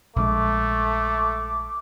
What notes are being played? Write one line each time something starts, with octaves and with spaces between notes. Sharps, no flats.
A#1 G#3 A3 D6